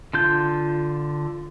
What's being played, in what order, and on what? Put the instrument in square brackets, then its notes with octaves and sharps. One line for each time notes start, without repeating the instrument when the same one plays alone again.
[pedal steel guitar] D3 F4 G6